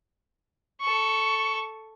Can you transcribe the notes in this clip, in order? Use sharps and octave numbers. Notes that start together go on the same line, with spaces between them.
A4 C#6